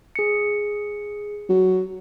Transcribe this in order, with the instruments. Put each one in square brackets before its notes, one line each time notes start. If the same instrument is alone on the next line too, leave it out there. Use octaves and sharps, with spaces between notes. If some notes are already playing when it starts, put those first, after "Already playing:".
[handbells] G#4 C#7
[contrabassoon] F#3